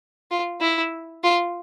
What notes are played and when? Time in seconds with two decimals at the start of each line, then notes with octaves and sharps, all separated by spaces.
0.31 F4
0.61 E4
1.23 F4